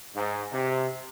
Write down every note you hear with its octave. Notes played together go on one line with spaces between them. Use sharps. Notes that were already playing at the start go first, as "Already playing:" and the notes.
G#2
C3